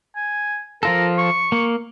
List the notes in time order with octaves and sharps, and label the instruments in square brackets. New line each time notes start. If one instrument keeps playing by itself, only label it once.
[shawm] G#5
[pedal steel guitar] F3 F4 A4 [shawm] A#4
[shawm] C#6
[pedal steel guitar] A#3